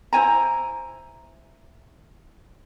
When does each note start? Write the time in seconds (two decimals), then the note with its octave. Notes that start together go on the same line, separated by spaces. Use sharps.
0.13 E4 C5 G#5 A#5